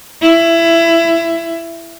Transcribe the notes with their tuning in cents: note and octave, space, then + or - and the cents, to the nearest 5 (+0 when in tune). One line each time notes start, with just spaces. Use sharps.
E4 +20